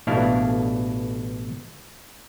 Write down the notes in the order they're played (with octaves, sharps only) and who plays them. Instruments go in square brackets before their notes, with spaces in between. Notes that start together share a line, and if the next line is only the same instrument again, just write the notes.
[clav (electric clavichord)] A1 B2 D4 E4 F5